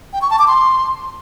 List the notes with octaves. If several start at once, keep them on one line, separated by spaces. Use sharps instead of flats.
G5
C#6
A5
D6
C6